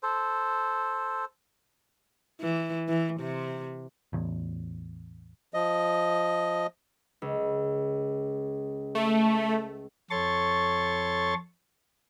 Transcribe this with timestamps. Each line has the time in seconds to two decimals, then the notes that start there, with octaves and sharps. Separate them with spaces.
0.03 A4 C5
2.41 E3
2.88 E3
3.20 C3
4.13 A1 E2
5.54 F3 D#5
7.22 C#2
8.95 A3
10.11 F2 A4 C#5 C6 C#6 A6